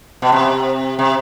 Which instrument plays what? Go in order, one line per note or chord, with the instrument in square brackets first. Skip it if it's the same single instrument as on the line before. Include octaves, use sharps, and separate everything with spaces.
[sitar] B2
C3
C3